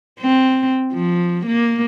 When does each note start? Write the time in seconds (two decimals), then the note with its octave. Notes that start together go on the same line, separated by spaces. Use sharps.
0.20 C4
0.94 F3
1.46 A#3